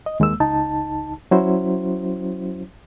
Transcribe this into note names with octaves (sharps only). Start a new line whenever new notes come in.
D#5
D#2 G#3 A#3 E6
C#2 D#4 A5
F#3 C#4 E4 F#4 C5